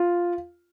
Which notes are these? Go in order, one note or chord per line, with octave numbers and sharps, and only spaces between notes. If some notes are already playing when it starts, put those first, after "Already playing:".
Already playing: F4